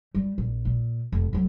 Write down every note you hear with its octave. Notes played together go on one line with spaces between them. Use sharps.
G3
A#1
A#2
F1
F1 F#3